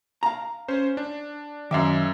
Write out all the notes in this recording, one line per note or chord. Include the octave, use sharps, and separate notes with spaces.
F5 A#5
C#4 C5
D4
F#2 D#3 E5 F5 D6